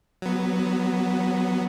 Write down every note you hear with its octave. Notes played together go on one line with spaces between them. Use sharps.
F#3 B3